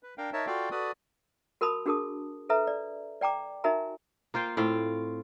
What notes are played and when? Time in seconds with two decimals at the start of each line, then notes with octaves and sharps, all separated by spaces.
0.03 B4
0.18 D4 A#4 F5 G5
0.33 D#4 A#4 C#5 E5 A5
0.47 F4 F#4 A4 D5 F5 G5
0.71 F#4 A4 B4 D5 D#6
1.61 F#4 A#4 A5 B5 D#6
1.86 D4 F#4 G#4 A#4 A5 D#6
2.49 A4 B4 E5 A#5
2.67 D5
3.21 D5 G5 A#5 D6
3.64 D#4 F#4 A#4 E5 G#5 A#5
4.34 A#3 F4 C5 G5
4.57 A2 C4 F4